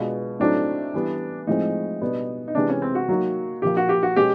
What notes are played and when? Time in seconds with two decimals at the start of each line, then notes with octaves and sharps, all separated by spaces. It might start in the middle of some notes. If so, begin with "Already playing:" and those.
Already playing: B2 G#3 B3 D4 F4
0.40 A2 F#3 A3 C4 D4 D#4
0.94 E3 G3 B3
1.47 A2 F3 G#3 C4 D#4
2.01 B2 G3 B3 D4
2.48 D#4
2.55 C3 E3 G#3 B3 D4
2.69 C#4
2.82 C4
2.95 F#4
3.09 F#3 A#3 D#4
3.62 A#2 F3 A#3 G4
3.77 F#4
3.89 G4
4.03 F#4
4.16 B2 G#3 C#4 G4